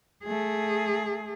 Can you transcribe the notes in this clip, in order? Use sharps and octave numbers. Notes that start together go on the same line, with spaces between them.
A3 G#4